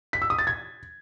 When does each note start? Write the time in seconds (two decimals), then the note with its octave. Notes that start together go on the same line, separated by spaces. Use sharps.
0.13 B6
0.22 E6
0.30 D#6
0.39 A6
0.47 G#6